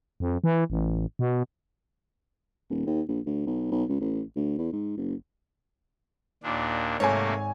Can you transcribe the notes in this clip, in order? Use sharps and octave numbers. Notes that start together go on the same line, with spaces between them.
F2
E3
A1
B2
D#1
D#2
A#1
D2
B1
B1
C#2
A1
D2
E2
G#2
F#1
D#2 A#2 D4
G#1 C3 A3 A#3 C#5 G#5